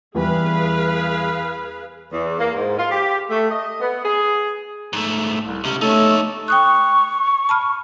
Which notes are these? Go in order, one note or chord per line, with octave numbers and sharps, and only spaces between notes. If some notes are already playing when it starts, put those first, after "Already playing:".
E2 E3 G3 G#4 B4 F5
E2
A#3
G#2
F4
G4
A3
D#5
B3
G#4
G#2 A3
C2
C#2 C3 C#4
A3 D#4 A4 C#5
G5 C#6 D#6 F#6
A5 B5 F6